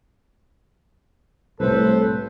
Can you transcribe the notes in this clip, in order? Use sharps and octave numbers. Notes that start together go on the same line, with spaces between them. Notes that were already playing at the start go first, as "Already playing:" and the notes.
C2 A2 A4 B4 C5